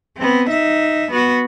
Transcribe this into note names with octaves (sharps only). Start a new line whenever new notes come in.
B3 C4
D#4 E5
B3 F#4